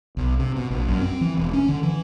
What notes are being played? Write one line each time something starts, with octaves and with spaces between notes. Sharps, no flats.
B1
C3
B2
A#1
F#2
C4
E3
E1
C#4
D3
E3